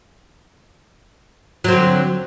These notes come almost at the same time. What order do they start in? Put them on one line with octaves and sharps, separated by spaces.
F#3 C4 D3